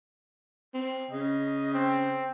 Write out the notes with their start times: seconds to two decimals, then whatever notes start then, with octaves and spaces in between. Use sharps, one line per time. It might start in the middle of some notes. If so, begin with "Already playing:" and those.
0.74 C4
1.11 C#3 D#5
1.74 C4